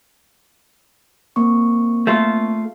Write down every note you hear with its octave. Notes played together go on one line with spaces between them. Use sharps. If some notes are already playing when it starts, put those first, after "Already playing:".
A#3 C4 C#6
A3 F4